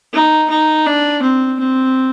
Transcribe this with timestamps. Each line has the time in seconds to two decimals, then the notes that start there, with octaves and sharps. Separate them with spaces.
0.13 D#4
0.50 D#4
0.86 D4
1.22 C4
1.59 C4